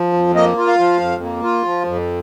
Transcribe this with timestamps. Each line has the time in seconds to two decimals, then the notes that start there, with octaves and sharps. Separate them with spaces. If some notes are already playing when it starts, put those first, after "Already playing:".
Already playing: F3
0.13 F2
0.35 A#3 D#5
0.57 F4
0.67 F5
0.79 F3
1.00 F2
1.22 A#3
1.43 F4
1.65 F3
1.87 F2